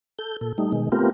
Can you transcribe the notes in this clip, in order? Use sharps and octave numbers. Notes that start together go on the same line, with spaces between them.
A4 G6
A#2 A4
G3 A3 D#4
B2 D#3 G#3
A3 B3 C4 F4 G4 A#4